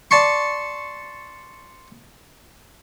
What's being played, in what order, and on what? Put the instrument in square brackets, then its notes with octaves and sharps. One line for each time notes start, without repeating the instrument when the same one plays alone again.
[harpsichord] D5 A5 C6 C#6